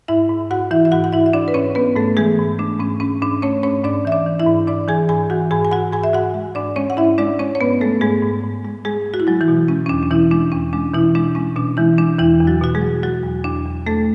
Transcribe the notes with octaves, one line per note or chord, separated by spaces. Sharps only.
G#2 E4 E5
G#2
G#2 F#4 F#5
E3 E4 E5
E5
G#2 F#4 F#5
F#5
G#2 E4 E5
E5
G#2 D4 D5
B4
G#2 C#4 C#5
G#2 B3 B4
G#2 A3 A4
E3 G#3 G#4
G#2
A3 D4
G#2 C#4
G#2 C#4
G#2 D4
A3 C#4 C#5
G#2 C#4 C#5
G#2 D4 D5
E3 E5
D4 D5
E3
E4 E5
G#2
G#2 D4 D5
E3 G#4 G#5
G#2 G#4 G#5
E3 F#4 F#5
G#2 G#4 G#5
G#5
G#2 F#4 F#5
G#2 G#4 G#5
E5
G#2 F#4 F#5
G#3
G#2 D4 D5
G#3 C#4 C#5
F#5
G#2 E4 E5
G#3 D4 D5
G#3 C#4 C#5
C#5
G#2 B3 B4
G#3 A3 A4
G#2 G#3 G#4
G#2
G#2
G#3
G#3 G#4
G#3
F#4
E4
F#3 G#3 F#4
E3 E4
B2
G#3 C#4
C#4
E2 D4
D4
B2 E3 E4
G#3 D4
E2 C#4
G#3 D4
B2 E3 E4
G#3 D4
G#3 C#4
B2 D4
E3 G#3 E4
G#3 D4
E2 E3 E4
E2
F#3 F#4
B2 F#4
G#3 G#4
F#3
F#3 F#4
E2
E2 D4
E2
E2 A3 A4